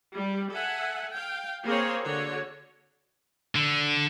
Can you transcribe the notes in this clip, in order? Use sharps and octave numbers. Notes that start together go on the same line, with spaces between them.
G3
A4 E5 F#5 G#5
F5 G5
A#3 C4 G#4 C5 C#5
D3 D4 F#4 C#5
D3